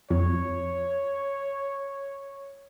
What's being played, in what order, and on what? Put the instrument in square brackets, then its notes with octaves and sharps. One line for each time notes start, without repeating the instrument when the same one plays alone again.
[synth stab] F2 [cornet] C#5